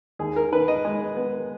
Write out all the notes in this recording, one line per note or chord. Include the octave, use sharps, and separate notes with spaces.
D#2 G#4
A#4
D#3 B4
D#5
G#3
B3